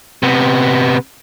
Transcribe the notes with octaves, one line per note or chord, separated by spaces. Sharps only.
C3 B3